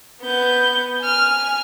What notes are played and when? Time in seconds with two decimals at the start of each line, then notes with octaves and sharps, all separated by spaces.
0.22 B3 G6
1.01 G#5 F6